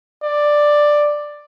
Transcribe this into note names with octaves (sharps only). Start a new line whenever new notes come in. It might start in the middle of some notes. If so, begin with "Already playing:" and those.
D5